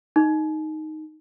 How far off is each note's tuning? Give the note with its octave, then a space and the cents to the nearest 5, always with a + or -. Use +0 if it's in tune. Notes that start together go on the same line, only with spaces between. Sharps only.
D#4 +0